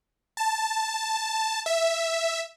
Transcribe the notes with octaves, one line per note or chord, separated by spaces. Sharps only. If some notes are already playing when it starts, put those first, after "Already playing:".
A5
E5